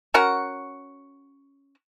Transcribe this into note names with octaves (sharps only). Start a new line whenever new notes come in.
C#4 F#4 A#4 F#5